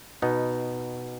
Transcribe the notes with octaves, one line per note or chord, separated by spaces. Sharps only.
B2 B3 D#4